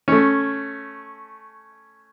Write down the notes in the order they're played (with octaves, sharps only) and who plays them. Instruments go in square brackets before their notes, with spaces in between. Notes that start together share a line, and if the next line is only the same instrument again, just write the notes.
[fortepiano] A3 C#4